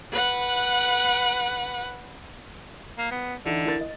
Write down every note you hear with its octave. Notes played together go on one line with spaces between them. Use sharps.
B4 F#5
A#3
B3
D3 E3 D#4 E4
E4 A#4 A6
D#5